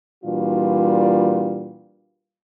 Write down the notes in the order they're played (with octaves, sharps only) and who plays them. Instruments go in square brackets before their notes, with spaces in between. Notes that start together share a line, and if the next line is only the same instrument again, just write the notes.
[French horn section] A#2 E3 G3 D4 F4 F#4